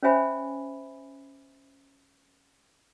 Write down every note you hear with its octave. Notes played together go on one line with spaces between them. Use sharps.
C#4 C5 C#5 E5 G#5 B5